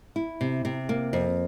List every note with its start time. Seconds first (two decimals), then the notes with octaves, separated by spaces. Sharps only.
0.16 E4
0.41 C3
0.65 C3
0.89 A#3
1.13 F2